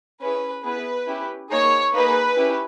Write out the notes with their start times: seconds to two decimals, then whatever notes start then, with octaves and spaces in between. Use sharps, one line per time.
0.20 C#4 E4 G#4 B4
0.64 B3 E4 G#4 B4
1.07 C#4 E4 G4
1.50 A#3 D#4 G#4 C#5
1.93 A#3 D#4 G#4 B4
2.36 C#4 E4 G4